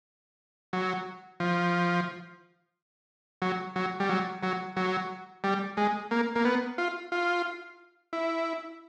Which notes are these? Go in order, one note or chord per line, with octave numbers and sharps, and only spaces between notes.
F#3
F3
F#3
F#3
G3
F#3
F#3
F#3
G3
G#3
A#3
A#3
B3
F4
F4
E4